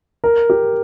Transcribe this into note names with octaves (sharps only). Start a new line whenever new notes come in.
A#4
G4